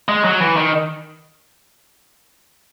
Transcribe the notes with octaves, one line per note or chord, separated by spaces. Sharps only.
G#3
F#3
E3
D#3